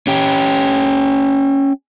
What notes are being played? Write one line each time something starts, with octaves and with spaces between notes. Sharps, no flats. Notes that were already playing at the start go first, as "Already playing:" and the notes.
C#4 G4